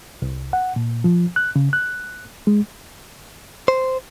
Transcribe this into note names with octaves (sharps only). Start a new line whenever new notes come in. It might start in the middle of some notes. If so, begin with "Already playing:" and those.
C2
F#5
A#2
F3
F#6
C#3
F#6
G#3
C5